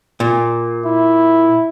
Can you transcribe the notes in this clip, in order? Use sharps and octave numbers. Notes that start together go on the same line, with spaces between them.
A#2
E4